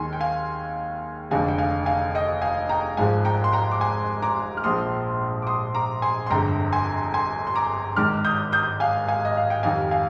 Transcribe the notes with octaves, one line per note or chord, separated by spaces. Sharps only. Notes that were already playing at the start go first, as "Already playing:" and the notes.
Already playing: D#2 D#3 G#3 G#5 C6
G5
F5 G#5
F1 F2 D3 G#3 F5 G#5
G5
F5 G#5
F5 G#5
D#5 G5
F5 G#5
G5 A#5
G#1 G#2 F3 G#3 F5 G#5
G5 A#5
C6
G5 A#5
D6
G#5 C6
A#5 D6
F6
A#1 A#2 F3 G#3 C6 D#6
D6
C6 D#6
A#5 D6
G#5 C6
C6
G1 F2 D3 G#3 G5 A#5
G#5 C6
G#5 C6
C6
A#5 D6
G#1 G#2 D#3 D6 F6
D#6 G6
D#6 G6
F5 G#5
F5 G#5
D#5
F5
G5
F2 D#3 G3 F5 G#5
F5 G#5